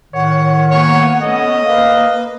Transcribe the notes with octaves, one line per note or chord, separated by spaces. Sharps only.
A2 D#3 C#5 F#5
A#3 B3 C#5 G#5
A3 B3 C#4 D#5
A#3 B4 F5